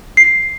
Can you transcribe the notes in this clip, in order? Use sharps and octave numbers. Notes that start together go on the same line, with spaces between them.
C7